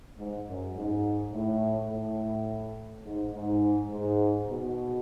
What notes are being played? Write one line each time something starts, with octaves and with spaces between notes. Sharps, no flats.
G#2
F#2
G#2
A2
A2
G#2
G#2
G#2
B2